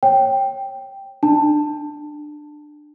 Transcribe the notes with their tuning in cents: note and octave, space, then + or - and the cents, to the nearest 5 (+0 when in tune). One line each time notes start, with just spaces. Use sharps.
C#5 -20 G5 +0
D4 +20 A5 +10